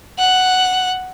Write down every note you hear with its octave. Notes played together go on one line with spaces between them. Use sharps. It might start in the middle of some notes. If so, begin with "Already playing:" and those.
F#5 F#6